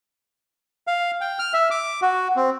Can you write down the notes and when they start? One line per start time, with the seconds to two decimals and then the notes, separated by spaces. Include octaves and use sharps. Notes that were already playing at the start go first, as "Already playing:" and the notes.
0.87 F5
1.21 G5
1.39 F6
1.54 E5
1.71 D6
2.02 F#4
2.36 C4